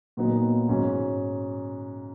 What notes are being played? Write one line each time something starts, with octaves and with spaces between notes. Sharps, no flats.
A#2 F#3 B3 D#4
G#2 F#3 C#4